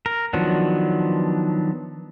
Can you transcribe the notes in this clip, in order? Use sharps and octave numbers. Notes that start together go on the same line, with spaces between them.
A#4
D#3 F3 F#3 B3 D4